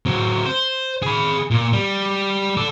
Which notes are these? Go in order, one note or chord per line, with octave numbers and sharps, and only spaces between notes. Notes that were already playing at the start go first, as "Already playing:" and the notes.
F#3 C4
C5
G#4 B5
A#2
G3
A4 D5